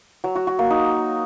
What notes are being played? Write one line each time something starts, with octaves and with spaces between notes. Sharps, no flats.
F#3
F#4
F#4
A#3
D#4